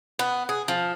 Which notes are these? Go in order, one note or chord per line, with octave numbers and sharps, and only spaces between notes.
B3
G#4
F3